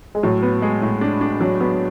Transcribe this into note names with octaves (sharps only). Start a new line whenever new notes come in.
G#3
A2 F#3
B3
G#3
A2
D4
D4
F#3 D4
F#3 B3